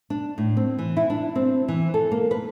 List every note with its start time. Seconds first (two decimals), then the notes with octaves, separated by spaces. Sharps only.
0.10 D4
0.38 A2
0.57 C4
0.79 E3
0.97 E4
1.10 D4
1.35 C4
1.68 E3
1.94 A4
2.12 A#3
2.31 B4